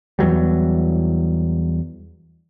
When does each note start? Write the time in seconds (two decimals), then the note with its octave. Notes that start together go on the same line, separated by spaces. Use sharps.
0.19 E2 E3 F#3 G3